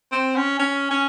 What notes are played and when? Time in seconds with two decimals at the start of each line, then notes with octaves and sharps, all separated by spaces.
0.12 C4
0.36 C#4
0.59 C#4
0.91 C#4